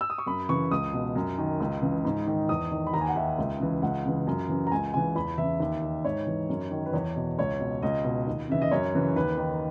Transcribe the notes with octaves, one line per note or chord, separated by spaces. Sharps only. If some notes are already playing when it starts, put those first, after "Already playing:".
E6
D#6
C#6
F#2 B5
C#3 E3 C#6
C#2 D#6
B2
F#2
D#3
C#2
C#3 E3
G#2
D#3
E2 D#6
D#3
B5
D#2 A#5
G#5
F#5
D#3 E5
C#2
C#3 E3
C#2 F#5
C#3 E3
F#2
C#3 E3
A#5
C#2 G#5
C#3 E3 G#5
E2 B5
C#3 E3 E5
D#2
D#3
G#2 C#5
E3
F#2
D#3
B4
E2 C#5
B2
C#2 C#5
B2
C#2 D#5
B2
D#2
C#3 E3 E5
D#5
F#2 C#5
C#3 E3
D#2 B4
D#3